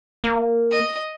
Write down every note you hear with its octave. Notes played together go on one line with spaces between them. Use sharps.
A#3
D#5